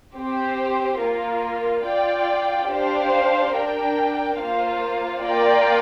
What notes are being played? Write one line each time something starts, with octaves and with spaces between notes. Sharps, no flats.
C4 G4 C5
A#3 F4 A#4
F4 D5 G5
D4 G4 C5 F5
D4 A#4 G5
A#3 F4 C5 F5
A#3 F4 A#4 D5 G5